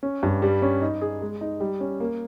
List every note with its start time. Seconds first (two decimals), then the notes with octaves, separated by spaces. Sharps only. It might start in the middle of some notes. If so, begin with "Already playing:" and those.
0.03 C#4
0.23 G2
0.42 G3
0.62 C#4
0.82 D#4
1.01 G#4
1.22 G#3
1.41 D#4
1.60 G3
1.80 C#4
2.00 A#3